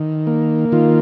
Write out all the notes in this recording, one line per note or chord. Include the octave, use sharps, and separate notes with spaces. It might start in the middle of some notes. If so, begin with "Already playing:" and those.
Already playing: D#3
A#3
D#3 F4